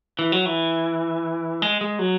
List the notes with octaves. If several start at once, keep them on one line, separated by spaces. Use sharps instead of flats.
E3
F#3
E3
G#3
G#3
F#3